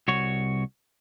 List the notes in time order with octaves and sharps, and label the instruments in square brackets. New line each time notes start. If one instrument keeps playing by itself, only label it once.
[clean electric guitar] C2 F#4 C#5